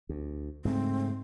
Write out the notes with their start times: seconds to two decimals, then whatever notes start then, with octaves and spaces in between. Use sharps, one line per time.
0.09 D2
0.65 G#2 C#3 A3 C4